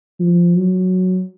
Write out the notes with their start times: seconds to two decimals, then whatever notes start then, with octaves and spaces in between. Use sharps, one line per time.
0.20 F3
0.56 F#3